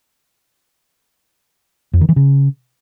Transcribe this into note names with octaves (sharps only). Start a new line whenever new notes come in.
F2
D#3
E3
C#3